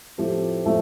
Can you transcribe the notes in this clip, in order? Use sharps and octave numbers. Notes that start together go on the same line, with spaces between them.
A2 F3 A3 C4 G4
A2 F3 A3 C4